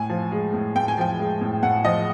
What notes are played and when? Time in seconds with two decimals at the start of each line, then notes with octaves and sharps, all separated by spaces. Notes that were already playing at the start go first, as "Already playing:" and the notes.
Already playing: A2 G#5
0.10 F3
0.31 G#3
0.53 A2
0.76 A2 G5
0.88 G#5
0.97 F3 G5
1.19 G#3
1.41 A2
1.63 A2 F#5
1.85 F3 D#5